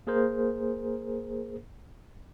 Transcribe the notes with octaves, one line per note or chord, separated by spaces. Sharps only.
A#3 G#4 A#4 C5